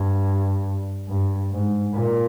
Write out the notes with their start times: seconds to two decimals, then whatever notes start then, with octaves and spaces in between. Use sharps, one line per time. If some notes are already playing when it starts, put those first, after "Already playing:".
Already playing: G2
1.08 G2
1.52 G#2
1.95 A#2